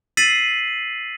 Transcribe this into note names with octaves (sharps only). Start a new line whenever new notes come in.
E6 A6 B6 C7 D#7 F#7